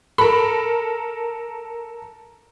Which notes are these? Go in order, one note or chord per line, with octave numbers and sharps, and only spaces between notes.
A4 A#4 B5